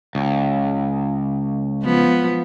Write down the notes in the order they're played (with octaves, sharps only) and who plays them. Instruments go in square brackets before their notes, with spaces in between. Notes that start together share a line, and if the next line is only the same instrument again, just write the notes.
[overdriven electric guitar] C#2
[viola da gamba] F3 B3